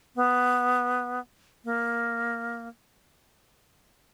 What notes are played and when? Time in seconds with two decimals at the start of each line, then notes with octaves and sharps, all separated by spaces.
0.16 B3
1.64 A#3